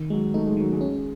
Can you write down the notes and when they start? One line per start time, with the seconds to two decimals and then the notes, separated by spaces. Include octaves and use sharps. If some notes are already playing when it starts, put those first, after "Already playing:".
Already playing: D#3
0.10 F#3 G#3
0.34 A3 D#4
0.47 G#3
0.57 D#3 F#3
0.72 G#3
0.81 C#4